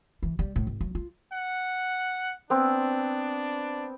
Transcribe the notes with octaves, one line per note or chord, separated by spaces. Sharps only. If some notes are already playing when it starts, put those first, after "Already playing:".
E3
G3
A2
G#1
F#3
F4
F#5
B3 C4 D4